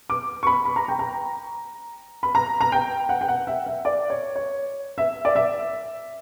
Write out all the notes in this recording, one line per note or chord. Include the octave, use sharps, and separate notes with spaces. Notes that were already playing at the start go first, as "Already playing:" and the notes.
D6
C#6
B5
B5
A#5
G5
A#5
B5
A#5
A#5
G5
F#5
G5
F#5
E5
E5
D5
C#5
C#5
E5
D5
E5